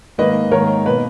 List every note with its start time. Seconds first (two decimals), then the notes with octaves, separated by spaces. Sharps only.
0.18 G#2 D#3 A#3 B4 D#5
0.51 G#2 D#3 A#3 A#4 C#5
0.85 B2 A#3 B4